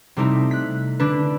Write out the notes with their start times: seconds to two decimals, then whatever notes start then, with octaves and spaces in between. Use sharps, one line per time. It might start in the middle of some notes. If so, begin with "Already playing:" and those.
0.17 C3 G3 A3 C4 D#4 E4
0.51 F#6 B6
1.00 D3 D4 B4